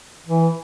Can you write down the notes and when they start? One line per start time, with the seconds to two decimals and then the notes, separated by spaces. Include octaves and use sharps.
0.26 E3